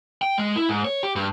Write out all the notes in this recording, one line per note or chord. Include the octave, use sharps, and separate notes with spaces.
G5
G#3
E4
G#2
C#5
G4
G2